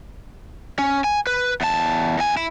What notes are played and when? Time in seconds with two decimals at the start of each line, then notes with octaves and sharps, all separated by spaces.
0.79 C#4
1.04 G#5
1.27 B4
1.61 E2 A5
2.18 E2 G#5
2.37 E4